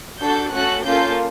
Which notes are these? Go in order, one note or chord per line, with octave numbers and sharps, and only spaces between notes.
D4 F#4 A4 G6
A3 C#4 F#4 A4 F#6
A#3 C#4 F4 A4 G6